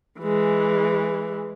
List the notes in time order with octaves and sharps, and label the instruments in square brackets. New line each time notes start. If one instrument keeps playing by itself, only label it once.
[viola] E3 G#3